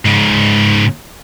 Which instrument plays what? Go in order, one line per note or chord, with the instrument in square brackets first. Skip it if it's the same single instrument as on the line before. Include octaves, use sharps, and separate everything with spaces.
[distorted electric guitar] G#2 C#3